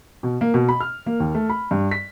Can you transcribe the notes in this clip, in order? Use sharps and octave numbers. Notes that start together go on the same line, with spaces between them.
B2
A#3
B2
B5
F6
A#3
D#2
A3
B5
G2
B6